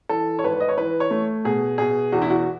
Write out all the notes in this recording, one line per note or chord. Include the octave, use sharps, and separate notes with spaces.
E3 A4
C#5
G#1 B4
D#5
C#5
E3 B4
C#5
A3
B2 G#4
B2 G#4
E2 F#4
E4
F#4